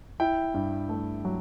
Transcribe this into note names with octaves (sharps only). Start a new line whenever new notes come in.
E4 G5
G2
A3
F#3